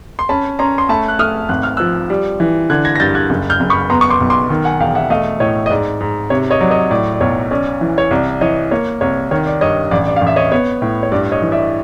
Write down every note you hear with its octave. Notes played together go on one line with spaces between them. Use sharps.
C6
C#4 A5 B5
C#4 A#5 C6
C6
A3 A5 B5
F#6
A3 D#6 F6
G#1 F#6
F6
F3 E6 F#6
G3
E3
D3 F#6 G#6
G#6 A#6
A#6
G2 G6 A6
F#6 G#6
F#1
F6 G6
F#1
B5 C#6
B3 A#5 C6
C#6
C6 D6
B1
C6 D6
D#3
F#5 G#5
E1 F5 G5
E5 F#5
A3 D#5 F5
A2 C#5 D#5
D#5
G#2 D5
G#2
C3 C#5
C#5 D#5
F#3 D5
C#5 D#5
A2 D5
D5
B1 C#5
C#4 D5
E3
C#5
C2 D5
E3 C#5 D#5
A#3 C#5
C2 C#5
D#3 C#5
D5
G2 C#5 D#5
A1 D5
D5
A1 F5
E5
C#5 D#5
B3 C#5
A2
C#5
G2 D5
C#5 D#5
E3
D5 E5